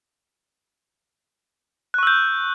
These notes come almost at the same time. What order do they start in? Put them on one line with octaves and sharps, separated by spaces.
F#6 C#6 E6 G6